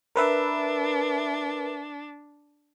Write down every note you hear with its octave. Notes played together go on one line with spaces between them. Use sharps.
D4 A#4 B4 E5